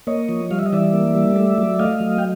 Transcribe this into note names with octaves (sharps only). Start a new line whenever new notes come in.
A#3 C#5 D#5
F3
G3 F5
E5
D#5
E3 D5 E5
A#3
G3
A3
F#3
A3 D#5 F5
F#3
G5